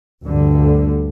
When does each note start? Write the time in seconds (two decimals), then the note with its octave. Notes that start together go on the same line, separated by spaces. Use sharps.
0.24 D2 G2 D3